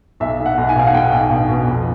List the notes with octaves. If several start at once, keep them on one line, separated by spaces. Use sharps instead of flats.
B1 E5
B1
F#5
B1
G#5
B2 F5
F#5
B1 G5
B1
B2
B2
F2